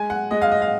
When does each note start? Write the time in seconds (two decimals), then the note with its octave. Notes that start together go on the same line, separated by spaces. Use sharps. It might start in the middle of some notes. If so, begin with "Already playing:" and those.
Already playing: G#3 G#5
0.10 F#5
0.31 G#3 D#5
0.42 F5
0.51 D#5
0.62 F5